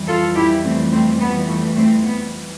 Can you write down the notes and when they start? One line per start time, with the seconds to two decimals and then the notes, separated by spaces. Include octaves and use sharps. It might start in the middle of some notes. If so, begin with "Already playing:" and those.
Already playing: F2 E3 G3
0.08 F4 A4
0.36 E4 G4
0.64 A3 C4
0.92 A3 C4
1.21 B3
1.48 A3
1.76 A3 C4
2.04 B3